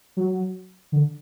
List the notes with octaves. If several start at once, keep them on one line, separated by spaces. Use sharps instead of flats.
F#3
D3